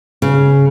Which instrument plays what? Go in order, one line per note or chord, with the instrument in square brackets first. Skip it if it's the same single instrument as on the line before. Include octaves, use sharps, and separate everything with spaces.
[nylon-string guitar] C#3